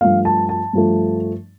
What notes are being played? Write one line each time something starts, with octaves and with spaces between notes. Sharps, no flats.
G2 F3 A3 F5
A5
A5
G2 F3 A3